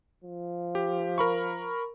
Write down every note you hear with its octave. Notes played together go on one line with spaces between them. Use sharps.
F3
G4
A#4 B5 C#6